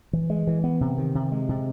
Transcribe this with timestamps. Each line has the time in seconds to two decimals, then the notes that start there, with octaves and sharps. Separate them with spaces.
0.13 E3
0.30 G#3
0.47 E3
0.64 B3
0.81 C3
0.98 D#3
1.15 C3
1.32 G#3
1.49 C3